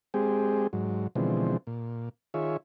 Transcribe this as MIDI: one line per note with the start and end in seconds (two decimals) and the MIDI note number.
0.14 0.67 56
0.14 0.67 60
0.14 0.67 67
0.14 0.67 68
0.73 1.07 44
0.73 1.07 54
1.16 1.57 47
1.16 1.57 50
1.16 1.57 52
1.16 1.57 53
1.16 1.57 56
1.16 1.57 60
1.67 2.09 46
2.34 2.57 51
2.34 2.57 65
2.34 2.57 68
2.34 2.57 73
2.34 2.57 76